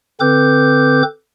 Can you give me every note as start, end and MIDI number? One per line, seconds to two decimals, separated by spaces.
0.20 1.03 50
0.20 1.03 60
0.20 1.03 69
0.20 1.03 71
0.20 1.03 86
0.20 1.03 91